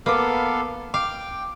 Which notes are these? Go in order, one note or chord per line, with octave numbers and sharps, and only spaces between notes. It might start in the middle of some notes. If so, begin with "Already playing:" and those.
A#3 B3 A4 B4 F5 D6
F5 G5 D6